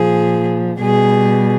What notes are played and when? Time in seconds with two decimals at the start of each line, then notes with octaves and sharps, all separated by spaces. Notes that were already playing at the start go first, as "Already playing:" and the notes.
Already playing: A#2 F3 G#4
0.79 B2 G3 G#4